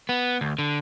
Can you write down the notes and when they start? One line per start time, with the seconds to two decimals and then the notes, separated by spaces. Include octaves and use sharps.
0.09 B3
0.41 D2
0.59 D3